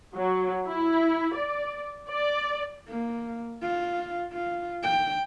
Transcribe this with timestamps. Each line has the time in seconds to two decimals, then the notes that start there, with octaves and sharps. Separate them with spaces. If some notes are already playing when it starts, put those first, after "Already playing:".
0.15 F#3
0.67 E4
1.35 D5
2.08 D5
2.88 A#3
3.62 F4
4.33 F4
4.83 G5